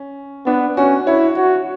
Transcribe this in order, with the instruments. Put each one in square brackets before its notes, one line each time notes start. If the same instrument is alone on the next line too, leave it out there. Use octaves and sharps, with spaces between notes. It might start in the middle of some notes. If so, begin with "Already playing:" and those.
Already playing: [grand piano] C#4
[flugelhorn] B3 [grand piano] D4
[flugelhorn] C#4 [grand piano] F#4
[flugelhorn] E4 [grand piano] C#5
[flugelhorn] F#4 [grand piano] C#5